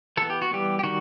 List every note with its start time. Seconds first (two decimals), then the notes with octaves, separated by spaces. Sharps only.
0.17 E3 B3 A4
0.30 G4
0.42 F#4
0.51 E3 G3 B3 G4
0.79 G4
0.83 D#3 G3 F#4